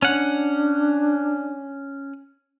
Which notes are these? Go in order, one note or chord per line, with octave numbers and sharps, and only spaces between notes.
C#4 D4 F#5